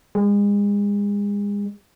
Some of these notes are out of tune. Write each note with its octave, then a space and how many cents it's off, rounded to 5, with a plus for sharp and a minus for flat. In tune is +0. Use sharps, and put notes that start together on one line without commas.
G#3 -35